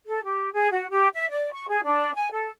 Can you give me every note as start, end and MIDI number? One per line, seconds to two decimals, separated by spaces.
0.07 0.22 69
0.24 0.50 67
0.53 0.68 68
0.71 0.87 66
0.90 1.08 67
1.14 1.29 76
1.30 1.49 74
1.52 1.68 85
1.68 1.80 68
1.83 2.14 62
2.14 2.28 80
2.32 2.49 69